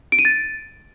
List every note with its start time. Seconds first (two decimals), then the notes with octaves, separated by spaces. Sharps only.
0.12 D7
0.19 D#7
0.25 A6